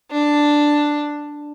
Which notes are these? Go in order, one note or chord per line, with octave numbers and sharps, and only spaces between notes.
D4